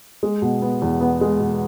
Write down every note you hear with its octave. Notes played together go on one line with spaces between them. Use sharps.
G#3
B2
B3
E2
B3
G#3
B2